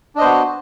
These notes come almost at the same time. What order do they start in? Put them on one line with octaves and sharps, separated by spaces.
D4 D#5 C5 B3 F#4